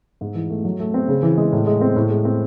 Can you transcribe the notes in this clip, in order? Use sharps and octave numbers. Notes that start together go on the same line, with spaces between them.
G#2
E3
A3
F#3
A3
C4
C#3
E3
G#3
A2
G#3
C4
A2
G#3
C4